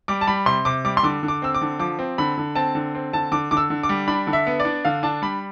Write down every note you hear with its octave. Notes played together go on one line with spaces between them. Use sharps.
G3 D6
A5
G3 B5
C3 C6
C3 D6
G3 D6
C6
D3 D6
D3
D6
C4 E6
D6
D3
F3 D6
C4
D3 B5
D3
C4 A5
D3
C4
D3 A5
D3 D6
D3 D6
E6
D3
D6
G3
D4 B5
D3
E5
B3
D5
D4
D3 F5
D4 A5
G3 B5